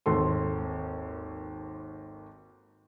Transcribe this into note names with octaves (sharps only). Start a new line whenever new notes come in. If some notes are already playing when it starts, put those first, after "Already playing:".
G#1 D#2 A4 C6